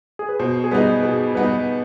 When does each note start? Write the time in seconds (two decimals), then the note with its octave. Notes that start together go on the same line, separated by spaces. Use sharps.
0.19 G#4
0.29 B4
0.39 B2 C5
0.64 G#4
0.71 G3 B3 D#4 B4
1.03 B2 G#4
1.35 G3 B3 D#4 B4